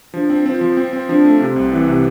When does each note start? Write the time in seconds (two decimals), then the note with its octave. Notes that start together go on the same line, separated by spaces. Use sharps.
0.14 F3 D4
0.30 C4
0.46 C4 F4
0.61 F3
0.77 C4
0.93 C4
1.08 F3 D4
1.25 A3
1.40 C3 C4
1.56 C2
1.72 E3
1.88 C3